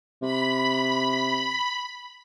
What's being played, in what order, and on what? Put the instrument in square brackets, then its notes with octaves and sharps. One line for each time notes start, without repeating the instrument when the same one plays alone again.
[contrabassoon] C3 [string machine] B5